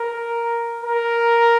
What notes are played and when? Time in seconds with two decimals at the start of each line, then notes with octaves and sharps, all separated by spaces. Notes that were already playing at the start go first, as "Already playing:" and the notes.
Already playing: A#4
0.84 A#4